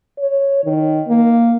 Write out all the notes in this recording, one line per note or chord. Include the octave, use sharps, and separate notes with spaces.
C#5
D#3
A#3